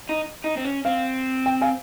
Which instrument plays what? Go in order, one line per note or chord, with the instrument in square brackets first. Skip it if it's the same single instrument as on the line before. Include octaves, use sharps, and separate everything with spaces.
[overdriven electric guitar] D#4
D#4
C4
C#4
[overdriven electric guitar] C4 [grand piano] F5
[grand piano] G5
F5 G#5